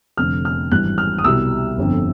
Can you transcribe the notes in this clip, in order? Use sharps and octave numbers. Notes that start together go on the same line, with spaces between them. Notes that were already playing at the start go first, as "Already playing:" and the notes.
F1 F2 D3 F6
F6
G#1 G2 E3 G3 F#6
F6
D#6
C2 B2 G3 E6
G1 F2 D3